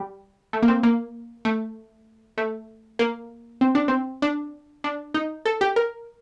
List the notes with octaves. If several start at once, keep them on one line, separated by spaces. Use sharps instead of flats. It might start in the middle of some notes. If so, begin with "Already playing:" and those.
Already playing: G3
A3
A#3
C4
A#3
A3
A3
A#3
C4
D4
C4
D4
D4
D#4
A4
G4
A#4